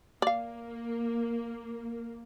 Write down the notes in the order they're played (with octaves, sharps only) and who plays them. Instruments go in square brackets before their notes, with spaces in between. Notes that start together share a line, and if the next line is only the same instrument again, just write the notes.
[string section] A#3 [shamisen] D5 F5